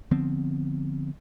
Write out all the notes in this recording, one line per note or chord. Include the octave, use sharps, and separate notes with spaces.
D3 F3 B3 C4